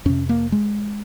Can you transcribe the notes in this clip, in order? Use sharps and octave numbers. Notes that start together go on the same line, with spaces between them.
F2 C3 C#4
A#3
G#3